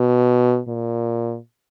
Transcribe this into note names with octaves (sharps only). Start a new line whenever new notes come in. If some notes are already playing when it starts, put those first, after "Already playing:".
Already playing: B2
A#2